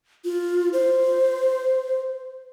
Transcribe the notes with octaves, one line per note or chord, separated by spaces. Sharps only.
F4
C5